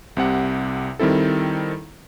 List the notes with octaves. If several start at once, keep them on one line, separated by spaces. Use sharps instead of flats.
C2 C3 F#5
D#3 G3 C4 E4 A4